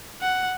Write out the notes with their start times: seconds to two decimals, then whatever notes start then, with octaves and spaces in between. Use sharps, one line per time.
0.22 F#5